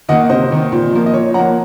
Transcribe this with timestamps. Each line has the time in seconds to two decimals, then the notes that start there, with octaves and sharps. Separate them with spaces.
0.09 D#3 A#3 D#5 F#5
0.29 C3 C5 D#5
0.50 D#3 A#3
0.72 A#2
0.92 F3 A#3
1.06 D#5
1.14 A#2 C#5
1.34 F3 A#3 F#5 A#5